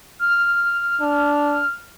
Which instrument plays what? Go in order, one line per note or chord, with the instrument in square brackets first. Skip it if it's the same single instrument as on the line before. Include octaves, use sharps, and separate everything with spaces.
[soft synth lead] F6
[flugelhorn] D4